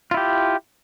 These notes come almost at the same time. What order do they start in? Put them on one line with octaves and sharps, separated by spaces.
F4 E4 G4